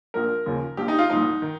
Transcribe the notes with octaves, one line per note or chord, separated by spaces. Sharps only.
A#1 A#2 F3 A#4
D#2 C#3 F3
A#1 A#2 F3 G4
D#4
F4
C2 A#2 F3 D#4
D#3